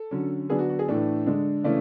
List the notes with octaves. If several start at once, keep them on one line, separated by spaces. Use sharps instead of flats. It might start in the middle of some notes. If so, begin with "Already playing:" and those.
Already playing: A4
D3 F#3 C#4
D3 F#3 B3 D4 G#4
F#4
F#4
G#4
A2 E3 A3 D4 A4
D3 G#3 D4
C#3 E3 A3 C#4 D5